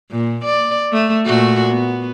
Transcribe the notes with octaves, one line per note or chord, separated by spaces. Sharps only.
A#2
D5
A3
A#2 A3 F#4
B3